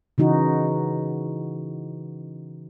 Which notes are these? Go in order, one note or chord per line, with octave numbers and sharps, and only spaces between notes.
C#3 E3 D#4 F#4